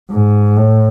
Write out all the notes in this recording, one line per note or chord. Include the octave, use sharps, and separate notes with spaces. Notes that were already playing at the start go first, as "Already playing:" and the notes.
G#2
A2